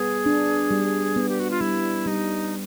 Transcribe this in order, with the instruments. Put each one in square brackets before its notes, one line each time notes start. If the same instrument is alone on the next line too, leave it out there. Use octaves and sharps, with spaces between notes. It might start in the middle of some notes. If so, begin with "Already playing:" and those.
Already playing: [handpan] G3 B3 [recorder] G#4
[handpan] D4
G3
B3
[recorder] G4
F#4
F4
[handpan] G3 [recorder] E4
[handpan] G3 [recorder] D#4